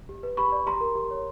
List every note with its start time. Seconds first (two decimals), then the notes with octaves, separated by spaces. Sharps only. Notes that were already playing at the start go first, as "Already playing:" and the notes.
0.09 G4
0.23 B4
0.37 G4 B5 C#6
0.52 D5
0.66 G4 A#5 C6
0.81 A#4
0.95 G4
1.11 C#5